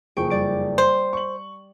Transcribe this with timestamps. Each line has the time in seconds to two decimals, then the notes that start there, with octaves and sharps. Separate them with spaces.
0.17 F#1 F2 G#4 G5 C#6 D7
0.30 G3 D5 D7
0.78 C5
1.13 C#6 F#7